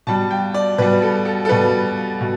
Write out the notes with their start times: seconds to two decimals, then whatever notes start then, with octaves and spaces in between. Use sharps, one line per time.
0.07 B2 G3 A5
0.31 G5
0.54 D5
0.78 B2 G3 B4
1.02 A4
1.25 A4
1.45 A4
1.49 B2 G3 B4
2.21 B2